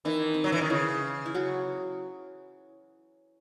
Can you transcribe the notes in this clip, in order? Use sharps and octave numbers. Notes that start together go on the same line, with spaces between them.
D#3 E3 D#4
C4
F#3 C#4
E3
D#3 D#4
C#3 E3 E4
E4
F#3 F#4